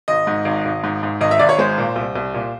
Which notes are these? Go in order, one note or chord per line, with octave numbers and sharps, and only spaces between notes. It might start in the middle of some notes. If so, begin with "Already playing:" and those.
G#1 D#5
G#2
G#1
G#1
G#2
G#2
G#1 D#5
E5
G#1 D5
C#5
G#3 C5
A#2
C2
C2
A#2